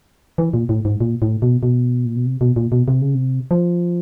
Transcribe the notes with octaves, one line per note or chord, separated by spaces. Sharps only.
E3
A#2
A2
G#2
A#2
A2
B2
B2
A#2
B2
C3
B2
A#2
B2
C3
C#3
C3
F3